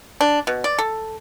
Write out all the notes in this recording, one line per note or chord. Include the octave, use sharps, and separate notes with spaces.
D4
B2
D5
A4